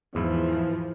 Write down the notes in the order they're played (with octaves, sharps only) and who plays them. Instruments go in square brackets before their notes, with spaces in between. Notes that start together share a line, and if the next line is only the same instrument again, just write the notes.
[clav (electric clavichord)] E2 G#2 E4 [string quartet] E3 F3